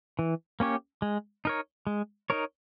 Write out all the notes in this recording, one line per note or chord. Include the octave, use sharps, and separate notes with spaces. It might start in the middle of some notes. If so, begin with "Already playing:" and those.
E3
A#3 C#4 G4 C#5
G#3
D#4 A#4 C#5
G#3
D#4 A#4 C#5